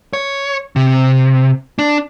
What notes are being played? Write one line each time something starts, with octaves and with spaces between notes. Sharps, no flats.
C#5
C3
D4